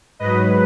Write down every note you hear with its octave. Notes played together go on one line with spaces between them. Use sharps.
G#2 F#3 B4 D#5